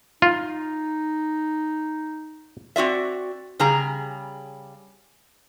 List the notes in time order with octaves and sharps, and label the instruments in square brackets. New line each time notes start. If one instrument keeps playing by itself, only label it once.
[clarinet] D#4 [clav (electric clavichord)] F4
[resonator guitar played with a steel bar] C4 F#4 D5 E5
C#3 G3 G#4 A#5